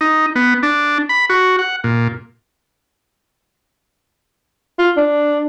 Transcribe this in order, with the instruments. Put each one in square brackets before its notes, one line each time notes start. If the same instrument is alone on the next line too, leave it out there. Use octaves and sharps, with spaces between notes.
[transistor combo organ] D#4
B3
D4
B5
F#4
F#5
A#2
[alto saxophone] F4
D4